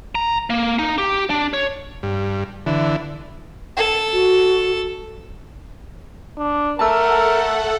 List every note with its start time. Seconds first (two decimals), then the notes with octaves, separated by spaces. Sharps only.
0.15 A#5
0.50 A#3
0.79 D#4
0.98 G4
1.30 D4
1.53 C#5
2.03 G2
2.66 D3 E3
3.77 A4
4.13 F#4
6.38 D4
6.79 A3 A4 A#4 F#5 A5 E6